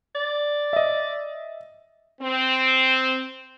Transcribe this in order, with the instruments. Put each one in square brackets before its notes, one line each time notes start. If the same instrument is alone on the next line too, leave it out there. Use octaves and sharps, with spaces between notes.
[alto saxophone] D5
[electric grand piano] D#5 E5
[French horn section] C4